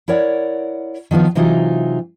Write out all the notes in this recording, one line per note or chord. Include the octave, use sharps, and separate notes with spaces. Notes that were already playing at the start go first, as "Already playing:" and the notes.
E4 A#4 C#5 D5 F#5
D#3 F3 B3 F4
C3 E3 F#3 D#4 F4